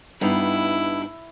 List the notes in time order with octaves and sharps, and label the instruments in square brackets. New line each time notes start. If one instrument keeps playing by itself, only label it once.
[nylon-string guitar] G2 B3 D#4 [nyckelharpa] E4